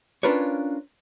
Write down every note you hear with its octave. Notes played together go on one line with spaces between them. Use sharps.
C#4 D4 F4 A#4 B4 C#5